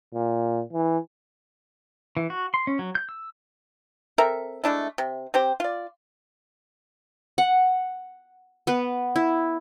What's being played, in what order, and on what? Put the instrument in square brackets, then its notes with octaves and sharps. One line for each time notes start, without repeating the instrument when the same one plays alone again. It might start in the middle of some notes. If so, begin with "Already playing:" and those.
[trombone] A#2
E3
[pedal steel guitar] E3
F#4
C6
C#4
F#3
G6
E6
[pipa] C4 A4 A#4 E5
G#3 A3 D4 E4
C3
C4 G4 C5
F4 D5
[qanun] F#5
B3 B4
E4